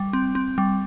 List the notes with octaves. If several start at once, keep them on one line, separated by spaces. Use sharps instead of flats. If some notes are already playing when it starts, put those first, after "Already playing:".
Already playing: G3
C4
C4
G3